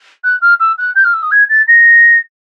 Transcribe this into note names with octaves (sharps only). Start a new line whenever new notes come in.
F#6
F6
E6
F#6
G6
F6
E6
D#6
G#6
A6
A#6